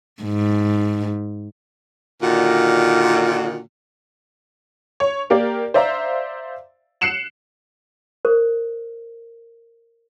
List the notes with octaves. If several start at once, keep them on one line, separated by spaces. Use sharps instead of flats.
G#2
A#2 D3 D#3 F4 F#4
C#5
A#3 G4 A#4 D5
C5 D5 E5 F5 A#5
F#6 C7 C#7 E7 F#7
A#4 C5